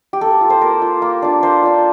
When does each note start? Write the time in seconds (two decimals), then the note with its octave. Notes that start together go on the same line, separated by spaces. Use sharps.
0.13 G4
0.21 A#3 A4
0.41 F4
0.50 C5
0.61 A#3 A#4
0.82 F4
1.02 A#3
1.22 D4 F4
1.43 A#3 C5
1.63 D4 F4